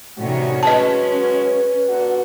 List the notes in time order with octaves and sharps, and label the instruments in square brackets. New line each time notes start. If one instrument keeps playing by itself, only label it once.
[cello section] A2 C3 D#3 [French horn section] G3 C#4 F#4
[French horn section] F#3 G#3 F#4 [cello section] C#4 [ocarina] B4 [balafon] D#5 A5
[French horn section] A#2 D3 F#4